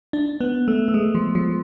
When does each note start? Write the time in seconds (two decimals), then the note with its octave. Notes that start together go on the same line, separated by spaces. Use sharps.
0.13 D4
0.41 B3
0.68 A3
0.88 A3
0.94 G#3
1.15 F3
1.35 F3